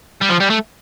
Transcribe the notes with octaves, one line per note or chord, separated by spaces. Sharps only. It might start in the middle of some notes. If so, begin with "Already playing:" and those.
G3
F3
G3
A3